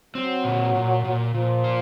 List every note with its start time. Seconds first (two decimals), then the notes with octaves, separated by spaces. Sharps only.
0.15 F#3 C4
0.44 A#2
0.74 A#2
1.04 A#2
1.34 A#2 F3
1.64 F4